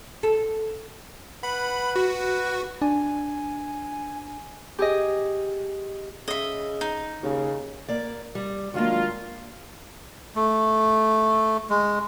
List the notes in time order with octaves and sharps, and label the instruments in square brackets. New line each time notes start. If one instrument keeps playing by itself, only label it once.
[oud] A4
[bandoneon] B4 F#5 [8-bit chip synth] B5
[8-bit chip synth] F#4
[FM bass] D4 [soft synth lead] G#5
[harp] G4 G#4 D#5
[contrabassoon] C#3 [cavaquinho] D#5 E5
[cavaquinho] D#4
[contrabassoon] D#2 [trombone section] C#3
[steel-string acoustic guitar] A#3 D5
G3
[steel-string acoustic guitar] D#3 G#3 A#3 [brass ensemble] F#3 D4 F4
[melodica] A3
G#3